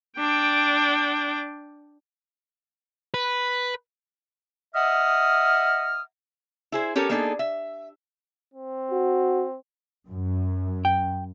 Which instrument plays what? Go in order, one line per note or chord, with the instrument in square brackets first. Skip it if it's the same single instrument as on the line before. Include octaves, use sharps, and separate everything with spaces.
[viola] D4 G5
[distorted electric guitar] B4
[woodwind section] D#5 E5 F#5 D#6 F6
[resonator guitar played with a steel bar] E4 G#4 C5
C#4 G4 A4 A#4 C#5
A#3 B3 D4 D#4 G#4 A4
E5
[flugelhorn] C4
[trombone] F#4
[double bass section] F#2
[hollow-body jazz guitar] G5